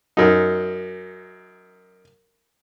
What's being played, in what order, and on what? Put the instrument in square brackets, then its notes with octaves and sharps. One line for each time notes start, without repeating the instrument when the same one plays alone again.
[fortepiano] F#2 D#4